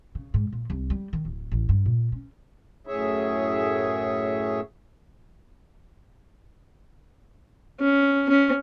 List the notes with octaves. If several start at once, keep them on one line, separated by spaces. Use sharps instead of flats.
C#3
G#2
A#2
C2
G3
D#3
D1
A1
G2
A#2
C#4
F#2 A2 G#4 C#5 E5
C#4
C#4